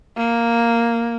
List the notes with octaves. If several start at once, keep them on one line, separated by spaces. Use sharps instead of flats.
A#3